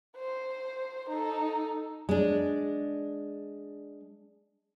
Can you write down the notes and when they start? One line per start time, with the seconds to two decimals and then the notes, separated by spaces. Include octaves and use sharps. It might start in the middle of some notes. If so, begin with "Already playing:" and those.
0.17 C5
1.10 D#4 A4
2.09 G#3 D4